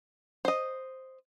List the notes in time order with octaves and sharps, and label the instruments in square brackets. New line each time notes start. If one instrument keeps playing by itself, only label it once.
[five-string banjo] C5 D#5